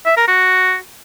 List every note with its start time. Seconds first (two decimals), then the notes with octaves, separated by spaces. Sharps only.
0.06 E5
0.17 A#4
0.28 F#4